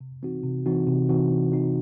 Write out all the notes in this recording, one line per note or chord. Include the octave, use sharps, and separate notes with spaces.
C3
E3 C4 D#4 F#4
C3
E3 C4 D#4 F#4
C3
E3 C4 D#4 F#4
C3
E3 C4 D#4 F#4